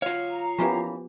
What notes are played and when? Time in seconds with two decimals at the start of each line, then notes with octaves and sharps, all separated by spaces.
0.02 F#3 F4 C#5 F5
0.31 A#5
0.59 E3 F3 A#3 B3 C#4 G4